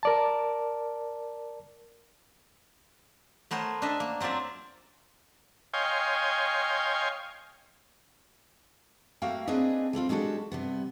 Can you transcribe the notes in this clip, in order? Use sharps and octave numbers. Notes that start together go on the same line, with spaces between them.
A#4 D5 A5
A3 B3 A#4 C5 C#5
D4 A4 D#5 E5
A#3
F#3 C4 F4 D5 E5
C#5 D#5 F5 G5 G#5 C6
A3 A#3 F#4 F5 G5
A#3 C4 D4 G#4 B4 D#5
E3 A3 C4 F4
G#3 D4 F#4 G4 A4
G2 C3 B3